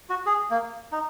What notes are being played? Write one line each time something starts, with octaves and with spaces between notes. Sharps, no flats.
F#4
G#4
A#3
D#4